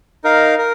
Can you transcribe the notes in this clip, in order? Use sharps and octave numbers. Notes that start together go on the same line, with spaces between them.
D#4 A#4 F5
A#4